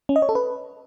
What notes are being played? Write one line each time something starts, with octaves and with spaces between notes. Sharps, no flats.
C#4
D#5
C#5
A4
B4